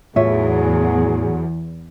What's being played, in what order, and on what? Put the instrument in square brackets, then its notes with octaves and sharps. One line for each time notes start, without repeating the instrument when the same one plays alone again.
[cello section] E2 [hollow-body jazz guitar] A2 [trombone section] F#3 F#4 G#4 [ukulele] F4 C#5 E5